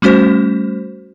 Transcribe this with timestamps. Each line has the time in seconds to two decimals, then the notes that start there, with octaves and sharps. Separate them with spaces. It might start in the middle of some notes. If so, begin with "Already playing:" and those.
0.02 G3 A3 C#4 F#4 C5